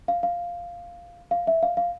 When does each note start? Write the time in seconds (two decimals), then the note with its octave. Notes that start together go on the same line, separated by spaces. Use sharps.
0.08 F5
0.23 F5
1.31 F5
1.47 E5
1.63 F5
1.77 F5